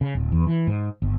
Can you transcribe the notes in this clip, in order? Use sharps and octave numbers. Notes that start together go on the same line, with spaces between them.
C#3
D1
E2
E3
G#2
G1